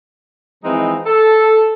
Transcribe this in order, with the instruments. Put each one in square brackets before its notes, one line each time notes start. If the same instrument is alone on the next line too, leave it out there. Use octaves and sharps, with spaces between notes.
[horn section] E3 F3 G#3 C4 D#4
A4